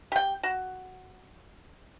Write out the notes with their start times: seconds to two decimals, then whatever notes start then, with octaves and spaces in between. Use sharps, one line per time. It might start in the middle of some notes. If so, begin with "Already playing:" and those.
0.12 G4 G5
0.43 F#4